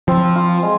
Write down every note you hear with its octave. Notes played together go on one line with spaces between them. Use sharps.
F3 C4
F4
G#3